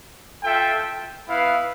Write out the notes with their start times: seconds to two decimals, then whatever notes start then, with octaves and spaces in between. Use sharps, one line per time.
0.43 F4 A4 E5 G5
1.28 B3 E4 B4 F5